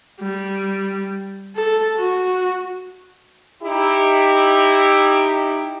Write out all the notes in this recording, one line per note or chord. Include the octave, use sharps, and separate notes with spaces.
G3
A4
F#4
D#4 E4 G4